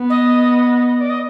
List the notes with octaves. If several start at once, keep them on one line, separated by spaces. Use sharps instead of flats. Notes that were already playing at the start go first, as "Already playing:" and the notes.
Already playing: B3
D#5
D5
D#5